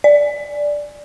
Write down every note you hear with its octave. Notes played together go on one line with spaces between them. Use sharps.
D5